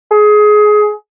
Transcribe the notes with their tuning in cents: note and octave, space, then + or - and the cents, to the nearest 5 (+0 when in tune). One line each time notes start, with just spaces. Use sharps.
G#4 +20